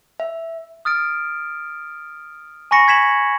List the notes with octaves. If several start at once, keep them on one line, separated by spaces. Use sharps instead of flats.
E5
D#6 F6 A6 D7
G#5 B5 C#6 A#6 C#7 E7
G#6 B6 E7 F#7